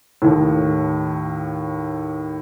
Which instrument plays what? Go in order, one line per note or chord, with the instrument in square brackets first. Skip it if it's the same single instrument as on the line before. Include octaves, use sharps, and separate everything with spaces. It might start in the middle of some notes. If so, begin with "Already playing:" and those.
[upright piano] D#2 A2